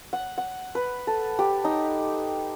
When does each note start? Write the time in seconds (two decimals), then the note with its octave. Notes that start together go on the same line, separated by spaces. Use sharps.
0.13 F#5
0.38 F#5
0.75 B4
1.07 A4
1.39 G4
1.65 D#4